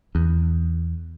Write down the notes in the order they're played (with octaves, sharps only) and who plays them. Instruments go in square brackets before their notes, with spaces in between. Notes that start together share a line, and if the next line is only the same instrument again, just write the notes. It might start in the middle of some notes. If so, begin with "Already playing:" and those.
[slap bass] E2